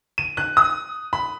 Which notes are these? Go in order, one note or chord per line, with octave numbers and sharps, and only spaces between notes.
D#7
F#6
D#6
B5